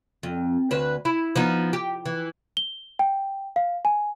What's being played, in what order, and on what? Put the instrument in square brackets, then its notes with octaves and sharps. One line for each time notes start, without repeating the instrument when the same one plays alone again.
[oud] F2
D2 B4 C5
E4
F3 B3 D#4
G4
E3
[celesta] G7
G5
F5
G#5